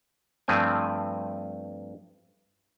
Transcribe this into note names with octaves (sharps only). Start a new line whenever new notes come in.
G2 F3 A3 C4 G#5